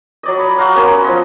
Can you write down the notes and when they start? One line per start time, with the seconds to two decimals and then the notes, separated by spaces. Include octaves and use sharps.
0.23 F#3 D5 D#5
0.38 B5
0.56 F#4 F5 A#5
0.75 A#3 B3 C#4 C6
1.04 F3 D#5